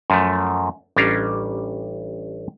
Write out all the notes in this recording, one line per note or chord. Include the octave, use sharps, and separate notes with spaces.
F#2 F3 A3
A1 G3 C#4 D4 F5 A#5